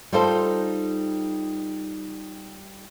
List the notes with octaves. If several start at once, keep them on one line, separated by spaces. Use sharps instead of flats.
G3 D#4 F4 A4 C5